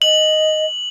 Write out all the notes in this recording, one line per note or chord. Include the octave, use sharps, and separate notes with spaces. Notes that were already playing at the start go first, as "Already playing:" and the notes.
D#5 F#7